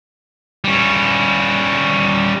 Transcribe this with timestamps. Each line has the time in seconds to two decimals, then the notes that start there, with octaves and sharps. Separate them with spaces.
0.64 G3 C#4